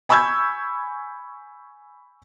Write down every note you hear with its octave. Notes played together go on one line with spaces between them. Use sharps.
G#5 B5 C#6 E6 G6 G#6